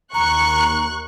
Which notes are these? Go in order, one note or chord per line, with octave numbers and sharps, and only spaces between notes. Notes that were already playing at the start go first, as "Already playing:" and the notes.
D#2 A#5 C#6 F#6